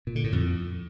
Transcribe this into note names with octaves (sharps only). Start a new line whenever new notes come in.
A#2
D3
A2
F2